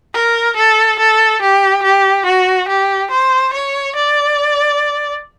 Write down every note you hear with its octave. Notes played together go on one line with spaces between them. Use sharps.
A#4
A4
A4
G4
G4
F#4
G4
C5
C#5
D5